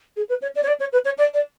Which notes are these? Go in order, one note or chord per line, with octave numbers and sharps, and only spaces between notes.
G#4
B4
C#5
D5
C#5
D5
C#5
B4
C#5
D5
D5